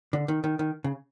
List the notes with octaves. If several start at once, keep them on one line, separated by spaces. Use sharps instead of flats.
D3
D#3
D#3
D#3
C#3